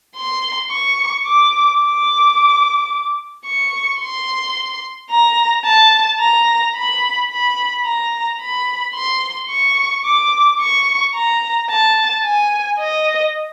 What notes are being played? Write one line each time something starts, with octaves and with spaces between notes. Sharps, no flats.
C6
C#6
D6
D6
C#6
C6
A#5
A5
A#5
B5
B5
A#5
B5
C6
C#6
D6
C#6
A#5
A5
G#5
D#5